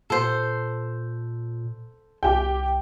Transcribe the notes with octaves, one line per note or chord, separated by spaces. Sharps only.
A#2 A4 C5
C2 G4 G5